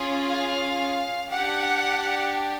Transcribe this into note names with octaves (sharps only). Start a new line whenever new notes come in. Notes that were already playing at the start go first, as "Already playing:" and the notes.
Already playing: C#4 F4 G#4
F5
D4 G4 F#5